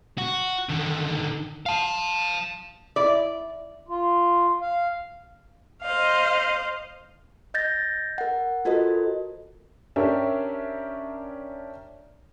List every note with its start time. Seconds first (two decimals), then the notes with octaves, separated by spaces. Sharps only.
0.18 F#4
0.69 D3 D#3
1.66 F5 A5
2.96 E4 D5
3.88 F4
4.61 F5
5.84 C5 D#5 F5
7.54 D#5 G6 A6 A#6
8.18 A#4 F#5
8.65 F4 F#4 A4 A#4 C5 D#5
9.96 C#4 D4 G4 A#4 E5